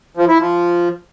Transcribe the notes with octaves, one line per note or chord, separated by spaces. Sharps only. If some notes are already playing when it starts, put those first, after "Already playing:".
F3
E4
F3